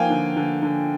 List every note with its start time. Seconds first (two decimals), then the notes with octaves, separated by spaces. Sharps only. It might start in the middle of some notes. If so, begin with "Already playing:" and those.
Already playing: F3 A#3 D#4 F5 G5 G#5
0.10 D3
0.36 D3
0.63 D3